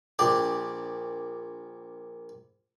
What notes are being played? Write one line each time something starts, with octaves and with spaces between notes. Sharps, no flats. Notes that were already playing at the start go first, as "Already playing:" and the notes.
A#1 D4 G4